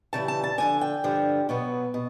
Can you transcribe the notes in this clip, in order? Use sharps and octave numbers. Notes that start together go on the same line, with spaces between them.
C#3 E3 G3 A5
A5
A5
G2 D3 F3 G#5
G5
G2 D3 F3
B2 F#3 B3
B2